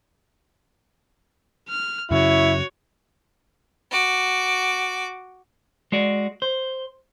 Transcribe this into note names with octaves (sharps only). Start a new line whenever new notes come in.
F6
F#2 C#3 E4 F#4 C#5
F#4 D6
G#3 F#4 D5
C5